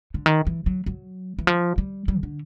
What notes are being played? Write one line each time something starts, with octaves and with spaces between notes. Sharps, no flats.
D3
D#3
E3
F#3
F#3
E3
F3
G3
G3
C#3
D3